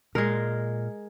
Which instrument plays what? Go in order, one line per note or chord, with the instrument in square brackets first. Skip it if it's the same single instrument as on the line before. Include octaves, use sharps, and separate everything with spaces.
[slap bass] A#2 [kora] G#3 A#4